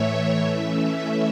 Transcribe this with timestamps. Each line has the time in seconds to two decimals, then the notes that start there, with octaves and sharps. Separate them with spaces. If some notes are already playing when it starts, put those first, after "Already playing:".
Already playing: A2 E3 A3 C#5 E5
0.46 E3 A3 C#4 E5